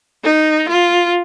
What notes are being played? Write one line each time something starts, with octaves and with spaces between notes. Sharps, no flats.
D#4
F4